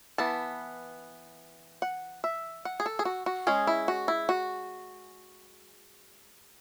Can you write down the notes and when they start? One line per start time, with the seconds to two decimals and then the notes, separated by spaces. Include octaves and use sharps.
0.18 E3 B3 A5
1.82 F#5
2.24 E5
2.65 F#5
2.80 G#4
2.86 A4
2.99 G#4
3.05 F#4
3.26 F#4
3.47 G#3 C#4 G#4
3.67 E4
3.88 F#4
4.08 E4
4.29 F#4